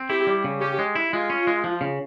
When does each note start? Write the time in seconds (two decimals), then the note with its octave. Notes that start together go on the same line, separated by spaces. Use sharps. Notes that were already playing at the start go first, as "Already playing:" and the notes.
Already playing: C4
0.09 E4 G4
0.27 G3
0.44 C#3
0.61 C#4 G4
0.79 G#3
0.96 E4
1.13 G#3 F4
1.30 C#4
1.47 G#3
1.64 F3
1.81 C#3